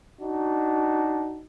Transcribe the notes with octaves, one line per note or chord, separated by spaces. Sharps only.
D4 D#4 F#4